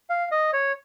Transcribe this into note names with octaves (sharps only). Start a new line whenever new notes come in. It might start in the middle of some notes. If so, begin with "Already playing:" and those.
F5
D#5
C#5